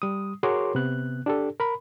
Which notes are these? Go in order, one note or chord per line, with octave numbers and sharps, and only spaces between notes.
G3 D#6
F#4 G#4 A#4 C#5 C6 D6
C3 B3 F#6
D4 G4 A4
A#4 B5